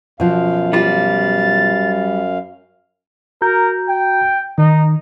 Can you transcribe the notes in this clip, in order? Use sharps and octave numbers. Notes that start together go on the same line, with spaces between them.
F#2 B2 F3 F5
G3 F4 A6
F#4 A#4 A#5 G6
G5
D#3 D#4